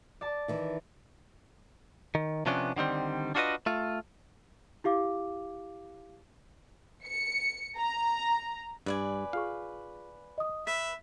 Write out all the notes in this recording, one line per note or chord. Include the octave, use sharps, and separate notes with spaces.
D5 A5
D#3 E3 D#4
D#3
C3 F3 B3 C#4 D4
D3 D#3 G3 C4
D4 F4 F#4 G#4 B4 D#5
A3 F4
E4 G4 F5 D6
C#7
A#5
G2 B4 D5 G#5
F4 G#4 F5 C#6
D#5 D#6
B4 E5 B6